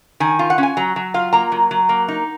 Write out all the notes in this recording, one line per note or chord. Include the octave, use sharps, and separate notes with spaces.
D#3 G#5
F4
F#5
C#4
G#5
F#3 A#5
F#3
F4 F5
A#3 A#5
F#3
F#3
A#3
D#4